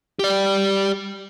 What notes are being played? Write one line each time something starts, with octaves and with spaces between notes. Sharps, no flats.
G4 D5